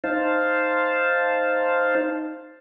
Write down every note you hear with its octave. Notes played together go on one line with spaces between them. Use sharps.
D#4 C5 F5 A5